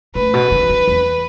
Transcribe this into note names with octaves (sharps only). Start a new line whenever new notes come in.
A2 B4
B2
D#3
D#3
E2